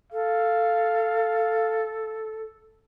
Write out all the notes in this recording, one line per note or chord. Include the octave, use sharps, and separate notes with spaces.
A4 F5